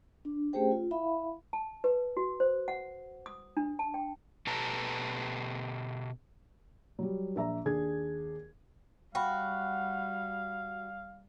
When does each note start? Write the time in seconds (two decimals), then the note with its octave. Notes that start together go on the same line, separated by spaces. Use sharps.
0.25 D4
0.53 A3 C#4 G4 G#4 C5 G5
0.71 F4
0.91 E4 E5 F5 B5
1.53 A5
1.84 B4
2.17 F#4
2.40 C5
2.68 F#5
3.26 D#6
3.57 D4
3.79 A5
3.94 G5
4.47 B2 G4 A4 B4 A5 A#5
6.99 F#3 G3
7.36 A#1 E5 A#5
7.65 D#2 D4 G#4 G#6
9.15 G3 F#4 F5 G5 B5